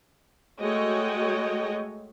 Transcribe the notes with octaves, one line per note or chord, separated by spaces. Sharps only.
G#3 A3 F#4 C#5 D#5 G5